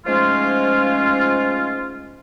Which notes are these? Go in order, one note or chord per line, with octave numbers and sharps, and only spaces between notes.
G#2 F3 G#3 A3 C#4 F4